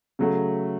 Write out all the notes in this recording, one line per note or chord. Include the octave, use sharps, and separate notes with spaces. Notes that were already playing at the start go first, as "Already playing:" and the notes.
C#3 F#3 A3